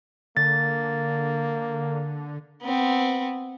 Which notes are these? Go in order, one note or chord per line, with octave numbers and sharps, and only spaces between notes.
D3 A#3 A6
B3 C4